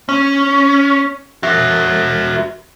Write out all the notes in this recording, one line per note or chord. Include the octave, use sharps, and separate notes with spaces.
C#4
F#4 E5